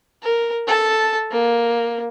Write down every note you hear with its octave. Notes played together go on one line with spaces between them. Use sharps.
A#4
A4 A5
A#3